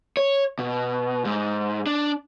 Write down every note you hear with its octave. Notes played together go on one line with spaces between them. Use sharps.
C#5
B2
G#2
D4